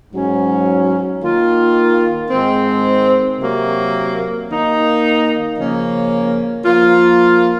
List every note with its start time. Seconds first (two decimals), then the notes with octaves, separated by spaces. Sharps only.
0.13 G#2 F#3 C#4
1.23 D#3 A#3 F4
2.30 G#2 D#3 G#3 C4
3.40 C3 F#3 A#3
4.48 D#3 A#3 D#4
5.56 C#3 F3 A#3 C#4
6.65 F3 A#3 F4